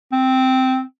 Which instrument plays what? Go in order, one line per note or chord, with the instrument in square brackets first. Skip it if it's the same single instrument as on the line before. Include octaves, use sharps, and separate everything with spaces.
[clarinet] C4